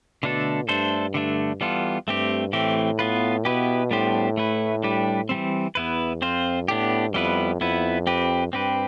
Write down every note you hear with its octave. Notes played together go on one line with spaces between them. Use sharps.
B2 D3 A3 D4 A4
G2 A3 D4 A4 C5
D3 A3 D4
E3 G3 B3 F4 A4
G2 A3 C4 G4
A2 E3 A3 C4 G4
B3 F4 B4
B2 B3 E4 G4 B4
A2 G3 B3 D4 G4 C5
A3 E4 B4
G3 D4 G4 B4
E3 G3 C4
E2 B3 E4 B4
F2 C4 F4 C5
A2 B3 D4 G4
F2 G3 B3 E4 B4
F2 B3 E4 B4
C4 G4 B4
G2 C4 G4 B4